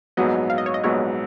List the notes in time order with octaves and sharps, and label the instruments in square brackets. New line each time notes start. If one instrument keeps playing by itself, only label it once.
[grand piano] A#1 G#2 F#3 B3 [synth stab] D#5
[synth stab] F5
D#5
C#5
D#5
[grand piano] A#1 G#2 F#3 B3 [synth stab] C#5